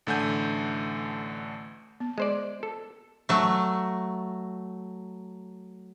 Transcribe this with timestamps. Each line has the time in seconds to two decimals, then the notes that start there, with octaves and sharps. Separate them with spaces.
0.07 A1 D3 A3 F#5 G#5 G6
2.00 B3
2.18 G#3 C5 D5
2.63 A4
3.29 F#3 A3